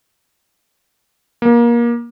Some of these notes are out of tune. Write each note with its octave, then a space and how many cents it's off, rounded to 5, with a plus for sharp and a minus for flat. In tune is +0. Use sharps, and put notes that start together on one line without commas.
A#3 +25